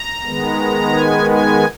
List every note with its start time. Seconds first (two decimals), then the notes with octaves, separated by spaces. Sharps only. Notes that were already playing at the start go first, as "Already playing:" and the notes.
Already playing: A#5
0.24 D#3 G#3 B3
0.94 G#5
1.30 G#5